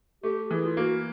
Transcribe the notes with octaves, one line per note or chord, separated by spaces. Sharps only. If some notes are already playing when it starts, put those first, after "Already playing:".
A3 G4
E3 G#4
F4
A#3 F#4